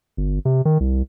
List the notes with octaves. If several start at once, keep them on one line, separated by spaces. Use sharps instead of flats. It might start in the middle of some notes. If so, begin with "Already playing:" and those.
G1
C3
D#3
C2